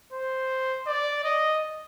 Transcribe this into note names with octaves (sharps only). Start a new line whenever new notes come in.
C5
D5
D#5